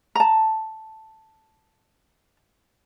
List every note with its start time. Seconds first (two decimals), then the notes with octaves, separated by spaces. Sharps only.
0.15 A5 A#5